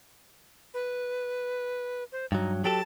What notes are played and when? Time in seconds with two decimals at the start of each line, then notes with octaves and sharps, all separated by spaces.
0.74 B4
2.12 C5
2.32 G2 F#3 D#4
2.64 F#3 G4 A4 A5